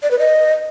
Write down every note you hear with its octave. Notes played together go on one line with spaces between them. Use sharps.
D5
B4
D#5